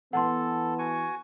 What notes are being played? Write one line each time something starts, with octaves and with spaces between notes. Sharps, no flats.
E3 B3 A4 F#5 A5 C6
F#4 G#5 C#6